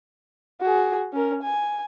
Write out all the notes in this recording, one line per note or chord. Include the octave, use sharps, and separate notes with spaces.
F#4 G#4
C#4 A#4
G#5